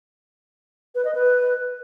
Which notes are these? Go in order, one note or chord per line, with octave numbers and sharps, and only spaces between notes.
B4
D#5
B4